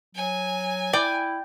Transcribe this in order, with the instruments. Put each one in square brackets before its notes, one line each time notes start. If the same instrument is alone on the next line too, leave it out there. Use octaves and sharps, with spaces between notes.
[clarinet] F#3 [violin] G#5
[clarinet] E4 [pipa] D5 [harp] G5